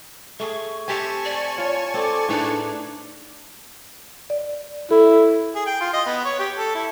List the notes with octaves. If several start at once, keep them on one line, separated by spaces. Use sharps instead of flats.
A3 G#4 C#6
C4 G4 C5 E5 G#5 A5 C#6
D5
F4 C#5
C4 A4 D5 D6
A2 D4 D#4 G#4 B4
D5
E4 A4
G#4
G5
F4
D#5
B3
C#5
G4
A4
E4